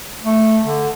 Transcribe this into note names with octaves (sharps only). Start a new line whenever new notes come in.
A3
D3